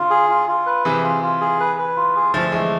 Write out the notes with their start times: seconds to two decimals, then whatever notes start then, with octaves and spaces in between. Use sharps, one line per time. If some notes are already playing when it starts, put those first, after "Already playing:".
Already playing: D3 F4
0.10 G#4
0.30 F4
0.48 F4
0.66 B4
0.85 C3 E3 G#4
1.04 F4
1.22 F4
1.41 G#4
1.60 B4
1.79 B4
1.96 F4
2.16 G#4
2.34 D3 F3 A3
2.52 E3 G#3 A3